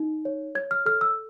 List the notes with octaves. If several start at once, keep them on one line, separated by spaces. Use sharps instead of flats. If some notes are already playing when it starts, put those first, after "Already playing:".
Already playing: D#4
C#5
C#5 G#6
F6
A4 F6
E6